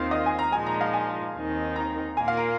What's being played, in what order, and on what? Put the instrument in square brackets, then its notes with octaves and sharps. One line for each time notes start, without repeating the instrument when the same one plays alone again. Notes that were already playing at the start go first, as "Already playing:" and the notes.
Already playing: [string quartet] D#2 D#3 C4 F4 [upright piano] F5
[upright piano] D#5
G#5
A#5
[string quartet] A#2 F3 G#3 D#4 [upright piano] G#5
[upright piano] A#5
F5
G#5
[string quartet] D#2 D#3 C4 D#4
[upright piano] A#5
[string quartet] A#2 A#3 F4 [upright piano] G#5
[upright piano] F5
A#4